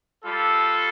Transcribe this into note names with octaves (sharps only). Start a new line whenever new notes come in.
G3 F4 A4